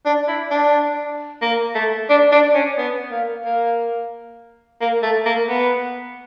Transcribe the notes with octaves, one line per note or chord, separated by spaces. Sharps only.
D4
E4
D4
A#3
A3
D4
D4
C#4
B3
A#3
A#3
A#3
A3
A#3
B3